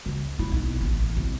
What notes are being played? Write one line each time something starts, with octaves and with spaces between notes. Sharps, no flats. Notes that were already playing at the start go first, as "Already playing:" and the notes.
C#2
E4
B1
A1
C2